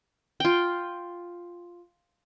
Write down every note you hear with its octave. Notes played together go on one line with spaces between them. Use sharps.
F4 G5